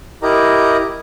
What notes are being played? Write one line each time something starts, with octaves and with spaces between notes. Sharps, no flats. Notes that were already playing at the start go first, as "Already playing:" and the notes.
E4 G4 A#4 D#5 A#5